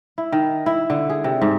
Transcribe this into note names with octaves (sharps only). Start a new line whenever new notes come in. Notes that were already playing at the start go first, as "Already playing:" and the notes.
E4
D#3
E4
D3
G#4
C3
G#2